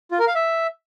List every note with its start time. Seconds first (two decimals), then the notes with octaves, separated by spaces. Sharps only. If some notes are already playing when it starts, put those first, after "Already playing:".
0.11 F4
0.19 A#4
0.27 F5
0.35 E5